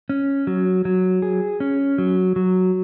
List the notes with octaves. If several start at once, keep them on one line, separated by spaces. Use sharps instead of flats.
C#4
F#3
F#3
G#4
C#4
F#3
F#3